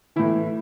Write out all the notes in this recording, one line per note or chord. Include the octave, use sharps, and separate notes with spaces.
A2 E3 E4